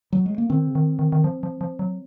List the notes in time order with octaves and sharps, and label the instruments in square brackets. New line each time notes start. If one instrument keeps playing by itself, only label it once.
[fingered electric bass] F#3
G#3
A#3
[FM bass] D#3 [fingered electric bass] C4
[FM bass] C#3
D#3
D#3
D#3
F3
F3
F3
F#3